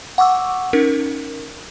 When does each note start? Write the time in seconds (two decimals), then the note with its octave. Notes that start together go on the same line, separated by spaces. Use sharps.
0.18 F#5 C#6 D6 E6
0.73 C#4 D#4 A#4